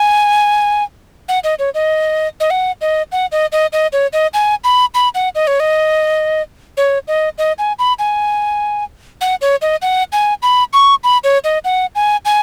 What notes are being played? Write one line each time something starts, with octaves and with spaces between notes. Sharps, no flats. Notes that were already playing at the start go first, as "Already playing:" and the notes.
Already playing: G#5
F#5
D#5
C#5
D#5
D#5
F#5
D#5
F#5
D#5
D#5
D#5
C#5
D#5
G#5
B5
B5
F#5
D#5
C#5
D#5
C#5
D#5
D#5
G#5
B5
G#5
F#5
C#5
D#5
F#5
G#5
B5
C#6
B5
C#5
D#5
F#5
G#5
G#5